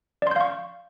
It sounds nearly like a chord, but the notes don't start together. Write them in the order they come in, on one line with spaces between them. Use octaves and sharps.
D5 C6 G6 F5 C#6